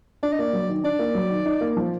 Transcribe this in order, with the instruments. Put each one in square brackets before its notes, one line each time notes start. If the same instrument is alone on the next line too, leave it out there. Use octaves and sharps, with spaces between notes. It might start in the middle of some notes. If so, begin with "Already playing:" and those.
[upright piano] D4 [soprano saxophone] D5
[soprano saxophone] D#5
[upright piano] A#3 [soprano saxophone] D5
[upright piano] F#3
D#3
[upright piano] D4 [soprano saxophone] D5
[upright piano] A#3
F#3
D#3
D#4
A#3
F3